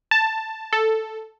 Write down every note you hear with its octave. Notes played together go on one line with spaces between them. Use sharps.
A5
A4